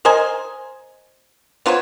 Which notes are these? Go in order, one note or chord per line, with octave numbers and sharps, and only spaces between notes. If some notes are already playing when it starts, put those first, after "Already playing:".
A#4 C5 D#5 G#5
B3 F4 C5 C#5